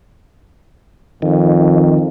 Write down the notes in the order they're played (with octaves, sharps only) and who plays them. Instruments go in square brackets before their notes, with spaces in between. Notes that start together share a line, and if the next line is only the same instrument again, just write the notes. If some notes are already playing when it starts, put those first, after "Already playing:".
[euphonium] F2 [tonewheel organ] D#3